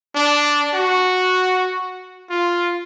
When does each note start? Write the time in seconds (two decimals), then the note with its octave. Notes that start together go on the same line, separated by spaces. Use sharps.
0.15 D4
0.74 F#4
2.30 F4